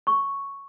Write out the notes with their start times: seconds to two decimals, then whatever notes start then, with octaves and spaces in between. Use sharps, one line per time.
0.07 C#6